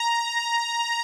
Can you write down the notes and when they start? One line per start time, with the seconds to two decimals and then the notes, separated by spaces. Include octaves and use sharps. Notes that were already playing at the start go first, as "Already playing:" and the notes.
Already playing: A#5